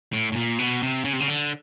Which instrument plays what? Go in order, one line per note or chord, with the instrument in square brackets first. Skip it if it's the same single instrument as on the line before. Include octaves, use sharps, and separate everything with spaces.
[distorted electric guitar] A2
A2
A#2
B2
C3
C#3
C3
C#3
D3